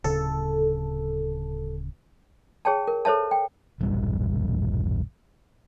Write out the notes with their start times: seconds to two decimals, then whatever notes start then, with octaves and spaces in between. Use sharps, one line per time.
0.04 D1 C#3 A4
2.65 G#4 C#5 G5 A5
2.88 A#4
3.05 A4 C5 C#5 E5 A5
3.31 G5
3.80 E1 A#1 G2 G3